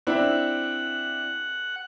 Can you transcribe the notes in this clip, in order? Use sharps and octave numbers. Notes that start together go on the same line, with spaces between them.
C4 D4 E4 F#5